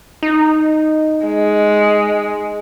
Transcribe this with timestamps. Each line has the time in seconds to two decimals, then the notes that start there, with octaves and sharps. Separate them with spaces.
0.23 D#4
1.26 G#3